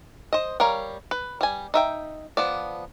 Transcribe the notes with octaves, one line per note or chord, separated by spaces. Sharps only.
C5 D#5
G3 A#4 C#5 F5
B4
G3 G#5
D#4 E5 G5
F3 B3 D5